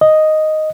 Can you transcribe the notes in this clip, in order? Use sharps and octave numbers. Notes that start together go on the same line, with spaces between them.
D#5